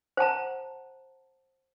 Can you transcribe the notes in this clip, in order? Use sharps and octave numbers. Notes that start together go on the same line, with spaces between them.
C5 F#5 A5 A#5